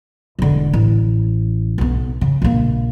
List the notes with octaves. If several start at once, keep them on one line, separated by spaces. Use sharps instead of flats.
E1 D3
A1
B1 B3
C#3
A#1 A#3